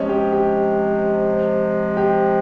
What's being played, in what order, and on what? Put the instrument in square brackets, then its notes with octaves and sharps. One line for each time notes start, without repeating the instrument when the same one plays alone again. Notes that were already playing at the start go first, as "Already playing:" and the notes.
Already playing: [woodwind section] C3 F3 G#3 [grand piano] C#4
[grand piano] G4
G4
G4